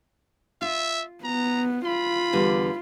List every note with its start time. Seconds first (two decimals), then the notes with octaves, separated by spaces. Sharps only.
0.61 F4 E5
1.24 B3 A#5
1.85 F4 B5
2.33 E2 D3 G3